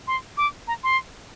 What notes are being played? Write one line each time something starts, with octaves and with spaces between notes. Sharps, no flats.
C6
D6
A#5
C6